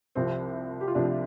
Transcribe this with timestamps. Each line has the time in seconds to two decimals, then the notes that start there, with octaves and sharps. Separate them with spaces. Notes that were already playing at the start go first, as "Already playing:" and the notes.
0.15 C2 C3 F3 C4
0.81 G4
0.88 F4
0.95 C2 C3 F3 D4